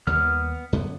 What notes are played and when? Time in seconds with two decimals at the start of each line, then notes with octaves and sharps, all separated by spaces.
0.07 D#2 D#3 G3 B3 F6
0.73 F#2 D3 B3